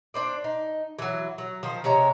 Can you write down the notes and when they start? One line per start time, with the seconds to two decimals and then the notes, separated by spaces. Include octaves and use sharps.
0.14 D4 C5 D5
0.44 D#4
0.99 E3 F#3
1.38 F#3
1.63 D#3 F3 C5
1.84 C3 G#3 C#5 A#5